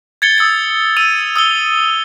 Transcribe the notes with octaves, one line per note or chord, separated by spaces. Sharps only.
G#6 A6 C#7 G7
D#6 E6 A6 C#7
E6 D#7 F7
D#6 E6 C#7 G7